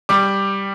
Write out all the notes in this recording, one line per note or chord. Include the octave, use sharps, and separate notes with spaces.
G3 D6